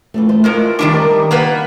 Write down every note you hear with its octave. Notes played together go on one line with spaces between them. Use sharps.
E3 F3 A3
A3 C5
A2 G#3 F4 A#4
D#3 G3 D4
G4 A#4 D#5
A#3 B3 B4